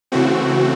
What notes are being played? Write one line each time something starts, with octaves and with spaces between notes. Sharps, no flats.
C#3 E3 A3 C4 F#4